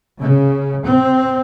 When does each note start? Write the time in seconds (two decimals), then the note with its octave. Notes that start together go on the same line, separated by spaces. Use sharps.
0.21 C#3
0.86 C4